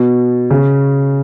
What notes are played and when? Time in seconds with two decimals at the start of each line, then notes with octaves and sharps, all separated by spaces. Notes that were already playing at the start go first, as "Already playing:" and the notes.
Already playing: B2
0.51 C#3